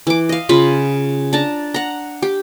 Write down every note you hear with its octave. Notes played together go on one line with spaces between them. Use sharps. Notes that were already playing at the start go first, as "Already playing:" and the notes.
E3 D6
D#5 F5
C#3 F4 G#5 B5
D4 A5 A#5
F#5 A#5
G4